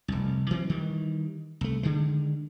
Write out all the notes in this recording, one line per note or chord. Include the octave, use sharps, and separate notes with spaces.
F1 C2
E3 F#3 C4
D#3 E3 G3
C2 A3
D3 D#3 G#3